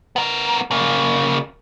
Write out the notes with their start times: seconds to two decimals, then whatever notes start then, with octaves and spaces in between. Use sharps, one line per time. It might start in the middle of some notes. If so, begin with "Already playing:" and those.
0.16 B3 A#4
0.71 C#3 A#3